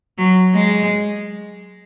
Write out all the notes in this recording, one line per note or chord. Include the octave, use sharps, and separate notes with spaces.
F#3
G#3